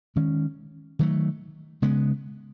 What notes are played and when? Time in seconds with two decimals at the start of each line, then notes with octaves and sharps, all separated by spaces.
0.16 D#3 G#3 C#4
0.99 D#3 F#3 A3
1.82 C#3 G#3 B3